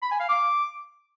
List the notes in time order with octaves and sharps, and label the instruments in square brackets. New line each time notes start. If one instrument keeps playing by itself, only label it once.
[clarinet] B5
G#5
F5
D6